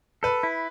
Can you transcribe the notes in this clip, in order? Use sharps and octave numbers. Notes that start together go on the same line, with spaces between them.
A4 B4
E4